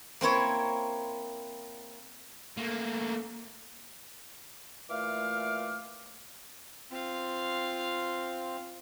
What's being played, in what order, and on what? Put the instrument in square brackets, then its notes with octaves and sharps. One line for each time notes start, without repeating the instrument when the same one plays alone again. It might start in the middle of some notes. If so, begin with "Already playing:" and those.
[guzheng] A#3 C4 E4 C#5
[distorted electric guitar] A3 A#3
[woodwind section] A#2 E3 A3 F5 D6 F6
[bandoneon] C4 [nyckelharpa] F4 F5